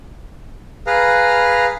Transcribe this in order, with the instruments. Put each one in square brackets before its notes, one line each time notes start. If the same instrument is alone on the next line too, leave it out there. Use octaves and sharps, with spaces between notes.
[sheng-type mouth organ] G#4 B4 F5 A#5